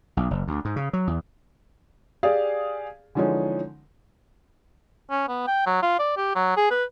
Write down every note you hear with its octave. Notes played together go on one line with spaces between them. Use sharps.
B1
F#1
D2
G#2
C#3
F#3
E2
G4 G#4 D5 F5
D3 E3 F3 G#3 C#4 D#4
C#4
B3
G5
F#3
F4
D5
G4
F#3
G#4
B4